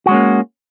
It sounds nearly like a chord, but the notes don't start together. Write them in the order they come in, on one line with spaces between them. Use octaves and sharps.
F#4 G#3 C#4 A#3